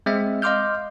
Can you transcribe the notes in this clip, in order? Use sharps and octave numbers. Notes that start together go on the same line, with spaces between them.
G#3 C4 E5
D#5 F5 C6 D6 F6 G6